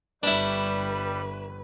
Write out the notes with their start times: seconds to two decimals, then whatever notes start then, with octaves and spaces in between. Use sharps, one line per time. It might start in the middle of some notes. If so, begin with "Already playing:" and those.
0.23 G1 G3 D4 E4 B4